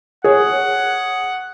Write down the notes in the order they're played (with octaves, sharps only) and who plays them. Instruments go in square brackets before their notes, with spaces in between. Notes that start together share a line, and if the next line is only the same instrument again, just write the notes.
[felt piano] G#4 C#5 [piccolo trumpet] F#5